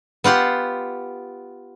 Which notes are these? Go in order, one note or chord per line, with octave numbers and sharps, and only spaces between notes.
B3 F4 G4 F#5